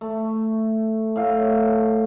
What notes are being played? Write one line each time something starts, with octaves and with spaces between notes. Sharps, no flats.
A3
A2 F5